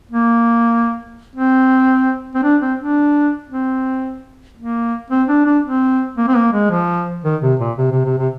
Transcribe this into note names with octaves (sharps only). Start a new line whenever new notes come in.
A#3
C4
C4
D4
C4
D4
C4
A#3
C4
D4
D4
C4
A#3
C4
A#3
G#3
F3
D#3
C3
A#2
C3
C3
C3
C3